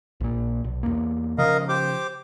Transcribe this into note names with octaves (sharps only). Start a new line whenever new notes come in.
A#1 A#2
B1
E2 A#3
C#3 F3 A#4 D#5 F5
G4 C5 D6